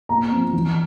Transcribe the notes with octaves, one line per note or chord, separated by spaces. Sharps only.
A#2 A#5
F3 C4
E3